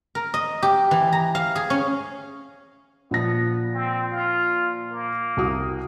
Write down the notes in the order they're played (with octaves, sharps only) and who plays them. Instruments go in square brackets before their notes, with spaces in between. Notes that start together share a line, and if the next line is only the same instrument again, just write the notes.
[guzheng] A#4
D#5
G4
E3
A#5
F5
G#4
C#4
[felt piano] A#2 F3 A#6 [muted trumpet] B3
[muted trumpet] C4
F4
A#3
[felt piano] C2 F#4 D#6